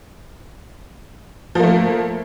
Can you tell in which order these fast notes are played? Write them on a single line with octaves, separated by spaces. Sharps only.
F3 A#3 A3